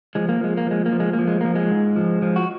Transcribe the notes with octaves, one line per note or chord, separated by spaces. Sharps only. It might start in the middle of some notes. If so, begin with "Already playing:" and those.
F3 G#3
A#3
F3 G#3
A#3
F3 G#3
A#3
F3
G#3
A#3
F3
G#3
F3 A#3
G#3
G#2
F3
F3
F#4